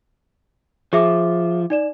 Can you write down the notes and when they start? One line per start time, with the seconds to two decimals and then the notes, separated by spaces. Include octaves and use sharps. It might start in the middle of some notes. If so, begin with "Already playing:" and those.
0.93 F3 G#4 E5 D6
1.70 D#4 D5 E7